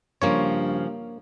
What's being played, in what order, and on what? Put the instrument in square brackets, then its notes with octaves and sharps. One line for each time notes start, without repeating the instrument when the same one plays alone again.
[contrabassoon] G2 [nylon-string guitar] C#3 F3 C#4 [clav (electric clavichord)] A#3 C#5